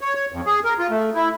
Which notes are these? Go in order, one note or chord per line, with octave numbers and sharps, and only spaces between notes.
C#5
C#5
F2
G#4
A#4
F4
A3
E4